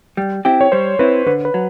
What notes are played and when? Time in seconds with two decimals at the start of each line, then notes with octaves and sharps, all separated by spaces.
0.17 G3
0.45 C4 E4 G4
0.61 C#5
0.72 G3 C5
0.99 C4 E4 B4
1.27 D3 B4
1.45 B4
1.54 F#3